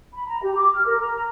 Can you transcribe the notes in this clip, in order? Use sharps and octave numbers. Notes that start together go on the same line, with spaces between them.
B5
A#5
G4
D6
F6
A#4
A#5
A#5